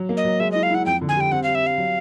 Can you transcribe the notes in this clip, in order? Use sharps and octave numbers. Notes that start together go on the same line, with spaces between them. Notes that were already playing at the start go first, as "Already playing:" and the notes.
Already playing: F#3
A#3
D#5
F#3
G#3 E5
E4 D#5
F5
E4 F#5
F2 G5
D3
G#5
G3 G5
C4 F#5
G3 F5
E5
G3 F5
F#3